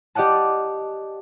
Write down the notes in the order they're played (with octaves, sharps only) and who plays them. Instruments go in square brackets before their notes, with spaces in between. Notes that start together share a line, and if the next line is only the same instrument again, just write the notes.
[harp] G4 D5 D#5 F#5 A5